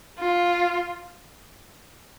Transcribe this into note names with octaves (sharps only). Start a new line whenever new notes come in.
F4